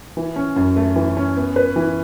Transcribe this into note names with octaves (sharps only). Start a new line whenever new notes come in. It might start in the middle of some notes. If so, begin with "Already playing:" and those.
E3
C#4
F#2
A3
E3
C#4
B3
B4
E3